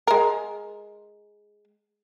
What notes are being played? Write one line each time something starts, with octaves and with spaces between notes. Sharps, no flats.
G#3 A#4